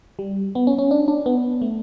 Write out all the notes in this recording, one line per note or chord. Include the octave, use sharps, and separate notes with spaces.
G3
B3
C#4
C#4
D4
D4
B3
A3